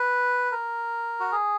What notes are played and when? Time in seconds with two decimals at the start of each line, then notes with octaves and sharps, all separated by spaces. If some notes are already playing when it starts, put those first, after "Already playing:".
Already playing: B4
0.52 A#4
1.20 F#4
1.32 G#4